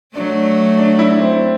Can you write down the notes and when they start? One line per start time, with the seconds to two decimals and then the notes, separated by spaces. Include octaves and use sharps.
0.15 F#3 A3 D4
0.78 D4
0.99 E4
1.20 C4